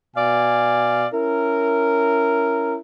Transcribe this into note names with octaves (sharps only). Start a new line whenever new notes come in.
B2 D5 F5 G#5
C#4 E4 A#4